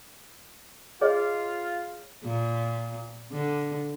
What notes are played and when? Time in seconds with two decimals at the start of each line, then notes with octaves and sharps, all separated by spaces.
1.01 F4 G#4 C#5 D#5
2.24 A#2
3.32 D3